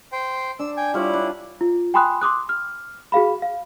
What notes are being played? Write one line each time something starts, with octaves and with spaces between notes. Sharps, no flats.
C5 G5
D4 E6
G5 G#5
G3 E4 F4 C#5
D4
F4
G5 G#5 B5 C6 D#6 F#6
C6 D6 D#6 F#6
F6
F#4 G#4 F5 B5
F5